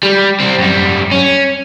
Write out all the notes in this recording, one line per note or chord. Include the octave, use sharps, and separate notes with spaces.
G3
G3 C4
F#2 G3
C#4